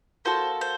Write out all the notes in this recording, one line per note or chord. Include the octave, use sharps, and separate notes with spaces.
A#3 F#4 A4 C5
C5